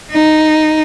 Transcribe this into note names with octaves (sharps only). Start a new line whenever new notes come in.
D#4